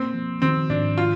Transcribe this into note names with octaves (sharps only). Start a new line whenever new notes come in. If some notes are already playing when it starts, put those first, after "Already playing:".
Already playing: A#3 C4
F3
D#3 C4
G#2 D4
F4